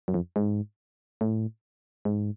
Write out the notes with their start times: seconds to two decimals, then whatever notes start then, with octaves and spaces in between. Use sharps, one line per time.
0.08 F#2
0.14 F2
0.36 G#2
1.21 A2
2.05 G#2